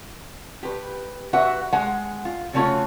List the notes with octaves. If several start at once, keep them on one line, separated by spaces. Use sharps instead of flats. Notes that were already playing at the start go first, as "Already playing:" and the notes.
G4 B4
F#4 B4 E5 F#5
G#3 F#5 G#5
F4
C#3 G3 A3 C#4 F4 F#4